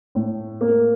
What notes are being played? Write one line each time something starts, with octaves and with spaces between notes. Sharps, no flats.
A2
A#3